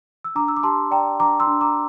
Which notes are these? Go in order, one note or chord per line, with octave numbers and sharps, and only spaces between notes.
E6
D4 A#5 D6
E6
D6
G4 A5 C6
D5 G5 A#5
D4 A#5 D6
C6 E6
D4
A#5 D6